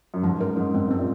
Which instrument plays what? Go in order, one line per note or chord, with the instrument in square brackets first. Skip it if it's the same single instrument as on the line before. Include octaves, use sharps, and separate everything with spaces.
[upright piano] F#2
[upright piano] G#2 [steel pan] F3
[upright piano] F#2 [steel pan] A#4
[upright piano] G#2 [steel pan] D#4
[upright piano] G#2 [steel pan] C4
[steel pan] C4
[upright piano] A#2